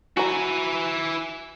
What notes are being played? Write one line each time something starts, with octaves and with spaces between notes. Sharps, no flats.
E4 F#4 G#5 A#5